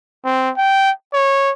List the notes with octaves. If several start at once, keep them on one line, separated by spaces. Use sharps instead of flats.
C4
G5
C#5